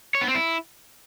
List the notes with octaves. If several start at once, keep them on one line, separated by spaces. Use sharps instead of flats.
C#5
B3
C4
E4